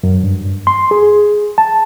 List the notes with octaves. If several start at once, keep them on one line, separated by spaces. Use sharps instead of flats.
F#2
G2
C6
G#4
A5